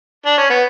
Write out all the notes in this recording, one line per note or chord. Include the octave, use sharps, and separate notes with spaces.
D4
C#4
B3